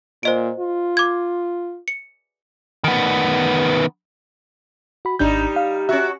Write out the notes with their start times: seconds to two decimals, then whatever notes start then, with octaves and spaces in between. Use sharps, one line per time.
0.23 A#2 C5 D#5 D7
0.60 F4
0.97 D6 G#6
1.88 C#7
2.84 D#3 B3
5.05 F#4 B5
5.19 G#1 G3 D4 D#4 G6
5.56 F5
5.89 C#4 F#4 E5